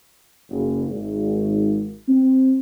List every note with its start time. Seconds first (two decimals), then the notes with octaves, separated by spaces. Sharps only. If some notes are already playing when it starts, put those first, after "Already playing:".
0.50 F#1
0.90 G#1
2.09 C4